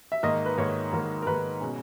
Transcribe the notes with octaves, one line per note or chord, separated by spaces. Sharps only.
E5
G#2 D#3 A#3 D#5
B4
G#2 D#3 A#3 C#5
G#2 D#3 A#3
A#4
G#2 D#3 A#3 B4
B2 G#3 C#4